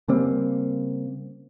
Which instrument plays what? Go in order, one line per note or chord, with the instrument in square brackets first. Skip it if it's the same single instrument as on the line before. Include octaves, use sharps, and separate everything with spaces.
[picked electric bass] C#3 G3 A#3 C4